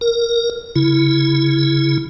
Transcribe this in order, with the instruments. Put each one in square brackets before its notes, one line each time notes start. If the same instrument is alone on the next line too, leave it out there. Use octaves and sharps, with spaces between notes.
[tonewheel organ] A#4
C#3 E4